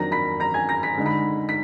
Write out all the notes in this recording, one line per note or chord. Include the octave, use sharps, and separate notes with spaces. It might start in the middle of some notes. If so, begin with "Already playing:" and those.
Already playing: F2 D#3 F#3 A#3 D4 A#5 A#6
B5 B6
A#5 A#6
G#5 G#6
A#5 A#6
B6
D3 G#3 D#4
B5 B6
B6